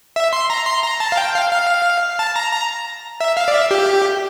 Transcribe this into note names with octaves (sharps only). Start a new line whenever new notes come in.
E5
C6
A#5
C6
A#5
A5
F5
G5
F5
F5
A5
A#5
A#5
E5
F5
D5
E5
G4